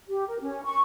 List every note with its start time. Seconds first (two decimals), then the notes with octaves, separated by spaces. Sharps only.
0.08 G4
0.28 A#4
0.40 C#4
0.65 C#6